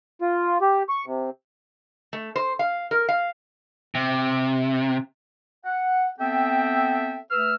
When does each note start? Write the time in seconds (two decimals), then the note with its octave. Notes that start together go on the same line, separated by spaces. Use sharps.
0.22 F4
0.61 G4
0.89 C#6
1.06 C3
2.13 A3
2.36 C5
2.59 F5
2.91 A#4
3.09 F5
3.95 C3
5.65 F#5
6.20 B3 C4 A4 E5 G5
7.31 A3 B4 E6 F6